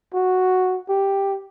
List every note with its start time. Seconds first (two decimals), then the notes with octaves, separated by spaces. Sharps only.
0.14 F#4
0.89 G4